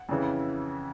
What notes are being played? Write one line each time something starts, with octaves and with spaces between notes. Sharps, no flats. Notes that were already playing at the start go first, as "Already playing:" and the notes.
Already playing: F#5
F2 C#3 E3